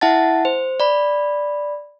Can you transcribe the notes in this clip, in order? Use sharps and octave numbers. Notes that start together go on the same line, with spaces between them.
E4 E5 F#5 A5 A6
C5
D5 B5